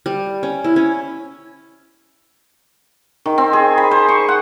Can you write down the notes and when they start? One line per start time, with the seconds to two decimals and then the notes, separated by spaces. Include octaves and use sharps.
0.06 G3
0.43 C#4
0.64 E4
0.76 C#4
3.26 D#3
3.38 C4
3.53 G#4
3.78 B5
3.91 C5
4.08 C#6
4.28 F#5